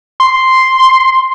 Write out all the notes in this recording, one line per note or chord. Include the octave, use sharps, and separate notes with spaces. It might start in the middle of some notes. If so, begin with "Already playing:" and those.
C6